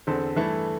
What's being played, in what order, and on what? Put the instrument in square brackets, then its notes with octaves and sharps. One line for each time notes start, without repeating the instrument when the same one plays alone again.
[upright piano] E2 D3 C4 A4 C5
G2 E3 A3 E4 A4